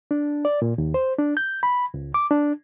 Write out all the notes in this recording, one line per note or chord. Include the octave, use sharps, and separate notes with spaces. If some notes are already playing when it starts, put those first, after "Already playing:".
D4
D5
A#2
D#2
C5
D4
G6
B5
C#2
D6
D4